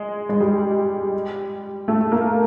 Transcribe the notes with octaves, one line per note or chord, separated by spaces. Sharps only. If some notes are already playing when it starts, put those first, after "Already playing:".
Already playing: G#3
G#3
G3
A3
A#3